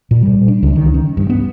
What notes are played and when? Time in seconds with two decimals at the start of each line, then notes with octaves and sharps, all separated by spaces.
0.11 A#2
0.23 G3
0.48 D4
0.63 C#2
0.75 D#3
0.94 C#4
1.17 G2
1.30 B3